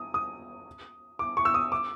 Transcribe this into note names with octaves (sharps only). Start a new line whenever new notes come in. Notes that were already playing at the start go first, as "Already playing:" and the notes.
Already playing: D#6
D#6
D6
C#6
E6
D#6
D6